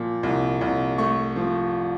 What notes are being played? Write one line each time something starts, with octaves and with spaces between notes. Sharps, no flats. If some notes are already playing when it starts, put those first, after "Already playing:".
Already playing: A#2 F3
C2
C2
A3 C#6
F3